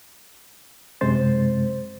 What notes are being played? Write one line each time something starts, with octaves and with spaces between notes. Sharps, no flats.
F#2 C3 G#3 C5 A6